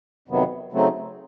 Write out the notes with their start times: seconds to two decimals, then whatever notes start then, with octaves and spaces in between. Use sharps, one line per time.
0.28 F2 C3 D#3 F#3 B3
0.72 C#3 F#3 A3 C4 D#4